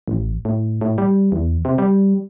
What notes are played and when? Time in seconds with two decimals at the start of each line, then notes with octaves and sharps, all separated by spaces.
0.08 A1
0.45 A2
0.81 A2
0.98 G3
1.32 E2
1.65 C3
1.78 G3